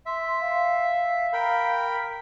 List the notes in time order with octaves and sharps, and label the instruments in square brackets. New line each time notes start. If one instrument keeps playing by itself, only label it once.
[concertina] E5 [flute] C6
[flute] F5
[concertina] A#4 G5 B5